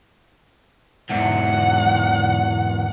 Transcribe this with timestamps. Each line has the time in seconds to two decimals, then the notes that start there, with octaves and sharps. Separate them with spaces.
1.10 E2 G#2 F#5